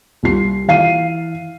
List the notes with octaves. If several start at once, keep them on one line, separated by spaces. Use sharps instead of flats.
C2 F4 C7
E3 F5 C7 D#7